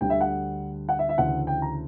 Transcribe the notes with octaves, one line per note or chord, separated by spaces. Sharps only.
D2 D3 G3 G5
E5
F#5
F#5
E5
E5
D2 C#3 E3 F#5
G5
A#5